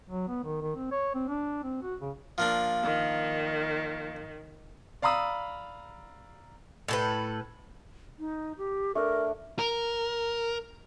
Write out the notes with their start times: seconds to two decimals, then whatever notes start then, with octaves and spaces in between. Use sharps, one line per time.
0.10 F#3
0.28 B3
0.43 D#3
0.62 D#3
0.76 C4
0.91 C#5
1.15 C4
1.28 D4
1.63 C4
1.82 F#4
2.01 C#3
2.38 F3 A#3 D4
2.84 D#3
5.02 D5 F5 A#5 B5 D#6 E6
6.88 A2 A4 B4
8.19 D#4
8.58 G4
8.95 A3 D4 A#4
9.59 A#4